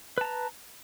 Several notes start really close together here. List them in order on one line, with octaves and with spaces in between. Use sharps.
B4 A5 A#5